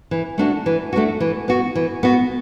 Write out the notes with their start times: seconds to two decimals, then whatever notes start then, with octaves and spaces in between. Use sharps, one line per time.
0.11 E3
0.38 A3 D4 F#4
0.66 E3
0.93 A3 D4 F#4
1.20 E3
1.48 B3 F#4
1.75 E3
2.03 B3 F#4